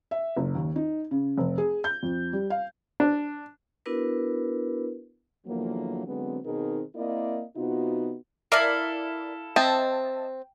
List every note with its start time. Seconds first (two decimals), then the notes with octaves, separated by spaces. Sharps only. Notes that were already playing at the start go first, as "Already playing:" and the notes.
0.11 E5
0.36 F#1
0.55 D#2
0.76 D#4
1.11 C#3
1.38 F1
1.58 G#4
1.84 G6
2.03 F2
2.33 G3
2.50 F5
3.00 D4
3.86 B3 D4 E4 F#4 A#4 B4
5.47 E2 D3 F3 F#3 A#3
6.07 D3 F#3 G#3 B3 C4
6.46 B2 D#3 C4 D#4 G#4 A#4
6.96 A#3 C4 E4 A#4 D5 D#5
7.57 C3 B3 D#4 F4 F#4
8.52 E4 A4 A#4 D5 E5 F5
9.56 C4 D#5 E5 A5